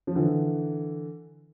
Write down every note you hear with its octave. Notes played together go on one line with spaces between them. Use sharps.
F3
D3 E3